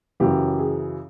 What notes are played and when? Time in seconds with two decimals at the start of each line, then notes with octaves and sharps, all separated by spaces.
0.20 F#2 C#3 E3 G4
0.59 G#4